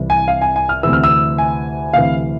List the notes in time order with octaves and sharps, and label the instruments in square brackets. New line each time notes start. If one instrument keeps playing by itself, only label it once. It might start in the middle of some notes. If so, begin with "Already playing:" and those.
Already playing: [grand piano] C2 C3 E3
G#5
F5
G#5
G#5
F6
D2 C3 E3 E6
F6
E6
G#5
D2 C3 E3 F5